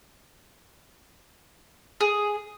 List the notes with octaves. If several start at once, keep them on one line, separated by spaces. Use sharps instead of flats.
G#4